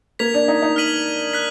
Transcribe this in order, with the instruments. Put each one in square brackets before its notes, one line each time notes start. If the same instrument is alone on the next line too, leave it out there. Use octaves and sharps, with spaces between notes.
[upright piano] A#3 [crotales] G#6 B6 F7
[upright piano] D4
D#4
D#4
[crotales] F6 B6 D#7 F#7
F#6 B6